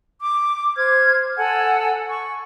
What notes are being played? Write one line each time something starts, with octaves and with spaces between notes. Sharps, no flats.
D6
C5 F6 G#6
A4 F#5 G#5
C#6